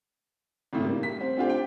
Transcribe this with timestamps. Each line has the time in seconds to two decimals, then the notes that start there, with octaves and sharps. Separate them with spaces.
0.73 G#1 A2 C#3 A3
0.84 G3 A#3
1.03 B6
1.21 C4
1.37 A3 C4 D4 F4 G4
1.50 G5